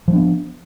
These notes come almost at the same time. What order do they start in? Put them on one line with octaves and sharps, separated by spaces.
F3 F#3 D4 B3